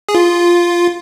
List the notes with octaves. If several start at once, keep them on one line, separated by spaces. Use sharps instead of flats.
G#4
F4